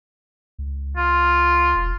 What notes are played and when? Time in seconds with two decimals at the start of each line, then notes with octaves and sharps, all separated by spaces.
0.59 C#2
0.97 F4
1.76 E1